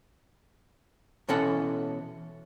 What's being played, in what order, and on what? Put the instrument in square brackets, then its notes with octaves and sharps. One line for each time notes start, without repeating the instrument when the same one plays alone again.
[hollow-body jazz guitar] B2 E3 C#4 A4 F#5